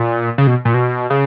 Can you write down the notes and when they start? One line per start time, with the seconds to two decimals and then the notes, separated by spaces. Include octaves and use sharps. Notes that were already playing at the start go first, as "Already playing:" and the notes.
Already playing: A#2
0.38 C#3
0.47 B2
0.65 A#2
0.74 B2
1.10 C#3